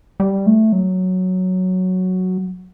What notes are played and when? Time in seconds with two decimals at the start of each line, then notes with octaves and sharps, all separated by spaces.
0.20 G3
0.46 A3
0.72 F#3